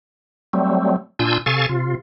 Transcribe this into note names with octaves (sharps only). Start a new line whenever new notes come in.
F#3 G3 A3 C4
A#2 D4 F4 G#5 E6 G6
C3 A4 F5 G#5 C#6 A6
C3 F4